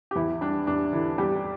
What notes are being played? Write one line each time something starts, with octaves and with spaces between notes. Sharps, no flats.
G4
E2 E3 E4
G3 D4
E2 D4
D3 E3 E4
E2 G3 G4